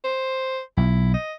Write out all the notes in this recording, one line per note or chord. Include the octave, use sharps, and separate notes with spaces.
C5
B1 E4
D#5